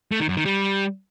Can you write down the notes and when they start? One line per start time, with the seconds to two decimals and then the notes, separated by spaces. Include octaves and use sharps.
0.12 A3
0.20 D#3
0.29 F#2
0.37 D#3
0.46 G3